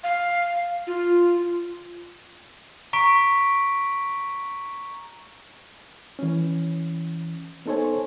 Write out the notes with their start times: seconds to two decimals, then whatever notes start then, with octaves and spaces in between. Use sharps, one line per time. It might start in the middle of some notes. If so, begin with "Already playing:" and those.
0.04 F5
0.87 F4
2.93 A#5 C#6 B6 D7
6.19 E3 C#4
7.66 B3 D#4 A4 C5 C#5 G#5